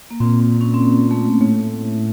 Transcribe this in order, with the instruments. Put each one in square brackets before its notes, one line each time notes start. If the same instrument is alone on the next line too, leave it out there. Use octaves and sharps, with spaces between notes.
[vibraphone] A#3
[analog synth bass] A#2 [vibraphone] C4
[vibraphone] C4
C#4
C4
A#3
A3
[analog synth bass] A2 [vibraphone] A3